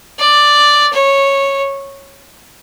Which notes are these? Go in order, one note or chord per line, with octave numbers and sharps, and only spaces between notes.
D5
C#5